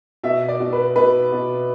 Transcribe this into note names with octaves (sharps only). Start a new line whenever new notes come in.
B2 E5
D5
B2
B4
B2 B4
B2